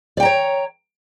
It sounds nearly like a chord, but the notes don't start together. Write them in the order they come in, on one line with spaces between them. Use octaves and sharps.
D5 G5 A#5 C#5